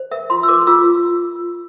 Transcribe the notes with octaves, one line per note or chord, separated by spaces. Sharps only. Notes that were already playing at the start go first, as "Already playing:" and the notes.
Already playing: C5
A#4 E5
F4 C6
E6
A#4 D6
F4 E6